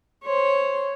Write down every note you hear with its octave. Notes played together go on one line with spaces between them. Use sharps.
C5 C#5